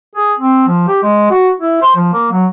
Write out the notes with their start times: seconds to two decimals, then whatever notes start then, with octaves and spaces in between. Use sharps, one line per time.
0.15 G#4
0.39 C4
0.67 F3
0.87 G4
1.02 G#3
1.30 F#4
1.60 E4
1.82 C5
1.96 F3
2.13 A#3
2.31 F#3